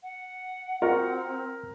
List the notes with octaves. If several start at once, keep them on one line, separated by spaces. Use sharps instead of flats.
F#5
C4 F4 F#4 A#4